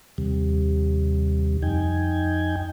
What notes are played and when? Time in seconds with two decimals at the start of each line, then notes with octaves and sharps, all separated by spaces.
0.18 D#2 C3 G3
1.62 F2 D#4 G5 G#5